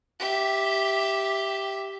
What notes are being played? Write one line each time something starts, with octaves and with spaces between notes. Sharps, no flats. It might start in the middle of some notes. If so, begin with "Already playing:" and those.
G4 E5